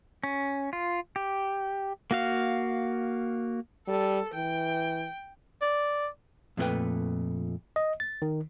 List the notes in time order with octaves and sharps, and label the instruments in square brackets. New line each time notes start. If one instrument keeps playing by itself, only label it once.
[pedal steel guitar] C#4
F4
G4
A#3 F#4 F5
[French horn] G3 [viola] A4
[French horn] E3 [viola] G5
[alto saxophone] D5
[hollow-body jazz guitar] F2 A#2 A3 D#4 B4 G5
[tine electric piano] D#5
A6
D#3